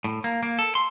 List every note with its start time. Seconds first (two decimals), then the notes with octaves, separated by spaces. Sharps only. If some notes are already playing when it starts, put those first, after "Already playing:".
0.04 A2
0.24 A#3
0.43 A#3
0.59 A4
0.75 C6